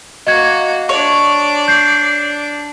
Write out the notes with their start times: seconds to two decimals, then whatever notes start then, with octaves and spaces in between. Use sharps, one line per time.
0.27 A#3 F#4 D#5 G#6
0.89 D4 C#5 D5
1.68 G6 C7